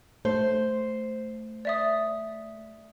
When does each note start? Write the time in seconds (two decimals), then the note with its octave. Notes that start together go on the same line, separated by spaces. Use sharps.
0.25 A3 C5
1.65 D5 E5 D#6